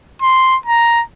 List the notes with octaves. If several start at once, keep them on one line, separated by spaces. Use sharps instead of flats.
C6
A#5